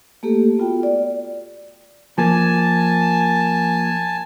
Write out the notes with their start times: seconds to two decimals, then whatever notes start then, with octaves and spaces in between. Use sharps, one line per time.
0.23 A3 A#3 G4 A4
0.59 B3 F4 F#4 G5
0.83 D5
2.18 F3 A#3 G#5 A5